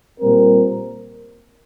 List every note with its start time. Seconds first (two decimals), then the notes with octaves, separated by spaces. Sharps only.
0.20 A#2 G3 C4 A#4